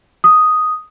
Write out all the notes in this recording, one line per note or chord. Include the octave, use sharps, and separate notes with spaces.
D#6